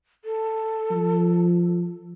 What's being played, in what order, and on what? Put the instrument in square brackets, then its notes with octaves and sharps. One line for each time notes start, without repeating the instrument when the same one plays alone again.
[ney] A4
[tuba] F3